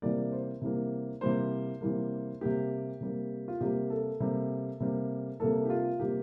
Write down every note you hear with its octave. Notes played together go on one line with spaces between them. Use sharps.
C3 E3 G3 A#3 D5
C5
C3 E3 G3 A#3
C3 E3 G3 A#3 C5
C3 E3 G3 A#3
C3 G3 A#3 G4
C3 G3 A#3
F4
C3 G3 A#3 G4
A4
C3 G3 A#3
C3 G3 A#3
C3 G3 A#3 A4
G4
F4
C3 G3 A#3 G4